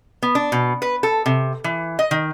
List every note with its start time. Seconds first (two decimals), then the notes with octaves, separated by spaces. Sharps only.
0.23 B3
0.35 D4
0.52 B2
0.82 B4
1.03 A4
1.26 C3
1.64 E3
1.99 D#5
2.11 D#3